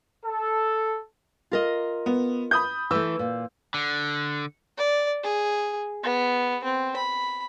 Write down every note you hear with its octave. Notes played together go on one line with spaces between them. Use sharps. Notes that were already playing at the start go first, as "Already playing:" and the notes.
A4
F4 A#4 D#5
B3
B5 D#6 G6
E3 A3 E6
A#2
D3
D5
G#4
B3
C4
B5